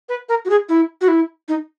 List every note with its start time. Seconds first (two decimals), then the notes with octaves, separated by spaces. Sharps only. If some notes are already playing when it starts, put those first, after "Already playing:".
0.09 B4
0.29 A#4
0.45 F#4
0.50 G#4
0.69 E4
1.01 F#4
1.08 E4
1.48 D#4